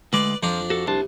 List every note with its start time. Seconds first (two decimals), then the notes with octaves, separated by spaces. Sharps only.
0.13 D2 G#3 B4 D5
0.43 F2 F3 D4 A#5
0.70 F#4 A4
0.87 C2 D4 C5 A5